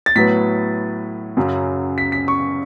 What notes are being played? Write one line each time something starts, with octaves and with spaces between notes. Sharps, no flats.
A6
A2 F#3 B3 B6
F#2 C#3 F#3
B6
B6
C#6